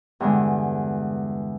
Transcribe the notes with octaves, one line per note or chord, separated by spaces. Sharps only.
E2 G2 D3 G#3